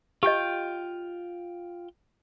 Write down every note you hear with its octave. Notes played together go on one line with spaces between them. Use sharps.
F4 G4 D#5 G5 G6